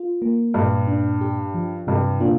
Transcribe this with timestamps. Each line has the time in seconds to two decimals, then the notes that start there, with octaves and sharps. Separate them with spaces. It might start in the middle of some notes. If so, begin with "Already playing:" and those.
Already playing: F4
0.22 A#3
0.54 G2 A#2
0.87 D4
1.21 G4
1.54 F3
1.87 G2 C3
2.20 A#2 D4